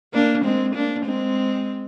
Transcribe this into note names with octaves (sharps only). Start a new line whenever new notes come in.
A#3 D4
G#3 C4
A#3 D4
G#3 C4